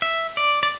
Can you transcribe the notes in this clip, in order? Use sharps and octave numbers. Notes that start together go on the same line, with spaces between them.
E5
D5
D5